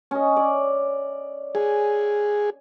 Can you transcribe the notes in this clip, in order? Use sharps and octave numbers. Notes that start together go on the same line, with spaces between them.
C#4 D#5
D5
G#4 G#5